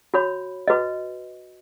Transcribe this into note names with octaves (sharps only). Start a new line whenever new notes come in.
F#4 C#5 B5
F#4 B4 D#5